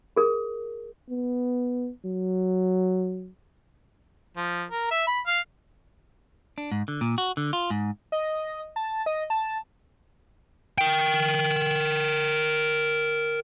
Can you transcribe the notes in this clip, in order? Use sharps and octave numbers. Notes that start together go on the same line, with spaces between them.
G#4 A#4
B3
F#3
F3
A#4
E5
B5
F5
D4
G#2
D3
A#2
F#4
D3
F4
G#2
D#5
A5
D#5
A5
A#4 G5